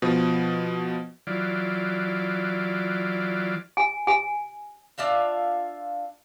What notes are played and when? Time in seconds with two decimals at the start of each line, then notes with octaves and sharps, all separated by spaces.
0.02 B2 F3
1.27 E3 F#3 F4 D5
3.77 G#5
4.07 G#5
4.98 D4 F4 E5 F5